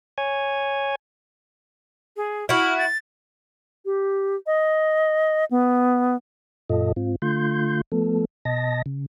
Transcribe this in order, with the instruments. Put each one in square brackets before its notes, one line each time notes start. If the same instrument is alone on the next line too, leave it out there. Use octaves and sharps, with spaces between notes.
[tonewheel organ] C#5 G#5
[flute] G#4
[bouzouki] E4 F#4 [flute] F6
[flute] A6
[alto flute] G4
D#5
B3
[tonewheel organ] F#2 A#2 F4 A4 D#5
G#2 C4 F4
D3 A3 F4 C6 G6
F3 A3 B3 A4
B2 D#5 A5 A#6
C#3